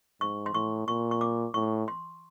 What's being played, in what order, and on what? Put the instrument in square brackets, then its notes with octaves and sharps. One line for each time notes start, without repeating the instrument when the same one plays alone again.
[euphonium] G#2 [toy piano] C#6
[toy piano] C6
[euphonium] A2 [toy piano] C#6
[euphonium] A#2 [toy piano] C#6
[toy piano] C#6
D6
[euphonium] A2 [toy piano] C#6
[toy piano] C6